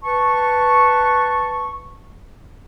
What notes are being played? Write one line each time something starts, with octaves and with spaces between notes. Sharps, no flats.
B4 A5 C#6